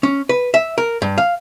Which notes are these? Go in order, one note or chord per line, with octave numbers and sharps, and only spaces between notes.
C#4
B4
E5
A#4
G2
F5